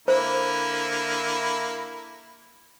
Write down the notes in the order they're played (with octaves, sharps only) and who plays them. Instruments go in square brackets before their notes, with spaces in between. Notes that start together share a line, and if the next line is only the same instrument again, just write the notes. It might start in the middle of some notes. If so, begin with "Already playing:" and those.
[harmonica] D3 A#3 E4 [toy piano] C5